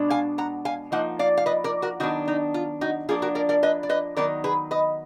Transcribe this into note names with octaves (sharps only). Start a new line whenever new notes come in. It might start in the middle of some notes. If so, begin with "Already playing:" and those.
Already playing: B2 G#3 D4
F5 G#5
F#5 A#5
F5 G#5
F3 A#3 D#4 D#5 F#5
D5 F5
F5
B4 D#5
A#4 D5
F#4 A#4
D#3 F#3 B3 D4 D#4 F#4
D#4
F4
D#4 F#4
F3 A#3 D4 F4 G#4
F#4 A#4
A#4 D5
A#4 D5
B4 D#5
D5
B4 D#5
D#3 F#3 B3 D#4 A#4 D5
G#4 B4
B4 D#5